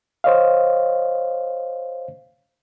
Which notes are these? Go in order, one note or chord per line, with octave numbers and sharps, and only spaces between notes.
C5 C#5 D#5 F5